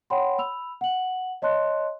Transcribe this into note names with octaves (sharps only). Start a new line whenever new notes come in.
C#5 F#5 G5 B5 C6
B5 E6 F7
F#5 F#7
C#5 D#5 A5 C6 F#6